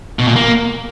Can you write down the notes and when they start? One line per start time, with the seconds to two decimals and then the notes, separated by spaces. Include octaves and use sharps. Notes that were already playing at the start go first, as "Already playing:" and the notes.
0.19 B2
0.27 A#2
0.36 A#3